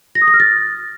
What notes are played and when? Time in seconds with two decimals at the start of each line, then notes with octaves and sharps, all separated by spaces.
0.15 A#6
0.21 D#6
0.28 A#6
0.34 F6
0.40 A6